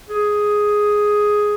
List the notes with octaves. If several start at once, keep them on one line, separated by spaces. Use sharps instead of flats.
G#4